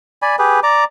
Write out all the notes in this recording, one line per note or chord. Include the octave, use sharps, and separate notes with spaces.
D5 G#5 B5
G4 G#4 B4
D5 A#5 D6